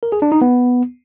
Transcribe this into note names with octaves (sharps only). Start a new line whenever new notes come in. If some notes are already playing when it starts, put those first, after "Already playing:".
A#4
G#4
D4
D#4
B3